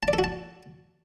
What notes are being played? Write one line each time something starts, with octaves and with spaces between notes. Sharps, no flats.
A5
D5
A4
F#4
A5